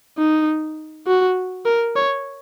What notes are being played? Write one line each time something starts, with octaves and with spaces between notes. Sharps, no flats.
D#4
F#4
A#4
C#5